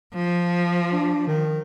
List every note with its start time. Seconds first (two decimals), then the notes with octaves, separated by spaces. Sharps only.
0.14 F3
0.92 D4
1.28 D#3